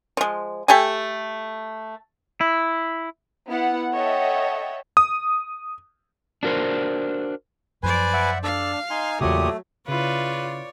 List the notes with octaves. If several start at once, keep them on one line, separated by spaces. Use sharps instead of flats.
F3 G#3
A3 G4 A4 G#5
E4
B3 E4 F#5
A4 C#5 D#5 E5 F#5 G5
D#6
D4 F#4 A#4 C5
F#2 F3 B4 C5 D5 G#5
E5 F#5
D4 A4 D5 F5
D#4 G#5 C6
E2 A#2 C#3 F#3 A3 G4 D#6
C#3 E4 F4 B4 C#5 D5